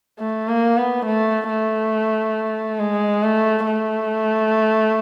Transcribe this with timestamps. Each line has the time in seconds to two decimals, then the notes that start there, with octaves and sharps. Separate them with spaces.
0.19 A3
0.48 A#3
0.77 B3
1.05 A3
1.49 A3
2.80 G#3
3.23 A3
3.66 A3